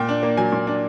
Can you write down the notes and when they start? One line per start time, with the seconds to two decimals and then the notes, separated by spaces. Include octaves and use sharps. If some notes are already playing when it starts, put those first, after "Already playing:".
Already playing: A#2 G5
0.09 D4
0.23 A#3
0.37 F#3 G#5
0.52 A#2
0.67 D4